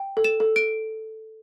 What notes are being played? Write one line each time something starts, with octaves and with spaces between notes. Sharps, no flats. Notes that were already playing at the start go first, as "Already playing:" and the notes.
Already playing: G5
A4
E7
A4
D7